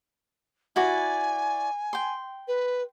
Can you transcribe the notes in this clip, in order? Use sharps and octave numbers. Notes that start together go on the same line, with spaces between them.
E4 F#4 D5 G#5
G5 C6
B4